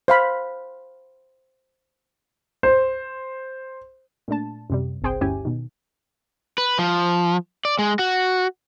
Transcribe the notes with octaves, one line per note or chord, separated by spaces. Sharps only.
C5 F5 B5
C5
A#2 A3 D4 A5
F#2 C3 G3
G1 C2 C3 G#4 C5 G5
G1 D2 C#4 E4 G4 G#5
B2 D#3
B4
F3
D5
G#3
F#4